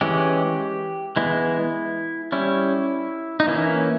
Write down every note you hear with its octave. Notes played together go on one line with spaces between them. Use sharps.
E3 G#3 C#4 G4
E3 G#3 B3 E4
G3 C#4 E4
D#4
E3 A#3 C#4 E4